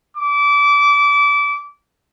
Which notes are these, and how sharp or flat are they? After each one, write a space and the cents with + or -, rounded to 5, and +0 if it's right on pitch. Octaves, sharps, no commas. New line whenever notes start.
D6 -25